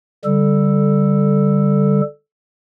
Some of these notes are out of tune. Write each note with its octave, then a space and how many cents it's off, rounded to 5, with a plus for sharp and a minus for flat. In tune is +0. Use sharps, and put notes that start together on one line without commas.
D3 -10 G3 +10 A4 +0